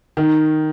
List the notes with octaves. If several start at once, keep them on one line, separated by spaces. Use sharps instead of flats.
D#3